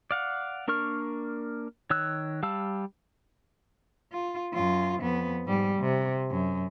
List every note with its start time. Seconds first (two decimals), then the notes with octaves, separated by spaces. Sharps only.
0.11 D5 F5 F#5
0.68 A#3 D4 A#4 C#6 F6
1.90 D#3 C#5 E6 F#6
2.43 G3 F5 A5 E6
4.12 F4
4.54 F#2 F4
5.01 F2 B3
5.46 G#2 G3
5.80 C3
6.31 F#2